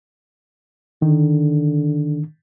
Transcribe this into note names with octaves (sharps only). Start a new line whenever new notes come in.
D3 D#3